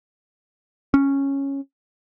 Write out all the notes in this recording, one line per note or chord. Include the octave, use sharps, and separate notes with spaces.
C#4